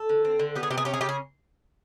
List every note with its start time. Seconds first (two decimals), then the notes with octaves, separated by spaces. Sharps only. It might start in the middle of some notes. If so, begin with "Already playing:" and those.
Already playing: A4
0.09 D3
0.25 C4
0.39 D3
0.55 B3 G4
0.63 G#4
0.70 C3 G4
0.78 G#4
0.85 C#4 G4
0.94 G#4
1.01 C#3 G4
1.09 G#4